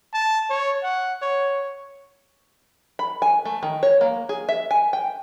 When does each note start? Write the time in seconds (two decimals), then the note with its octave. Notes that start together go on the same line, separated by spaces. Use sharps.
0.14 A5
0.50 C#5
0.83 F#5
1.22 C#5
2.99 B5
3.22 G#5
3.45 A3
3.63 D#3
3.83 C#5
4.01 A#3
4.29 G#4
4.49 E5
4.71 G#5
4.93 G5